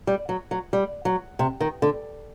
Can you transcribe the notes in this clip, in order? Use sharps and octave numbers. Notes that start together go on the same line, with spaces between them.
G3
F#3
F#3
G3
F#3
C3
D#3
D3